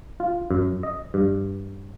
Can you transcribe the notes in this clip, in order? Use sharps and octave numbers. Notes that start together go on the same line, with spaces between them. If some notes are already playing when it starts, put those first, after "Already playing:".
F4
F#2
D#5
G2